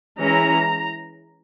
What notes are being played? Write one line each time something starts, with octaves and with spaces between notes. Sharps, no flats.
E3 G#3 C#4 E4 A#5